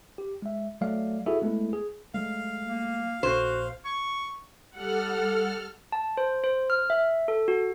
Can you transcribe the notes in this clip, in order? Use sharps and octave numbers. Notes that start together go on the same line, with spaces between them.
G4
G#3 E5
F#3 A3 D5 F5
E4 F#4 G#4 A4 E5
G#3 A3 B3 E4 A4
G#4
F#3 G#3 A3 F5
A#3
A#1 F#4 C5
C#6
G3 A4 F#5 F6
A5
C5
C5
F6
E5
A4
F#4